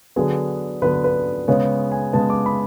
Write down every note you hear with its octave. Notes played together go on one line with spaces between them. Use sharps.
D3 F#3 B3 G#4
D3 F#3 B3 B4
B4
C#3 G#3 B3 C#5
G#5
C#3 G#3 B3 A5
D6
B5